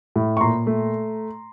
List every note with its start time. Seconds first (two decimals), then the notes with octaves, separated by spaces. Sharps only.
0.16 A2
0.37 C#6
0.41 A#2 A#5 C6
0.67 A3